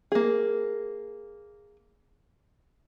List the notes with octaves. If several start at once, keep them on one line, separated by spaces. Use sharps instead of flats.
A#3 G#4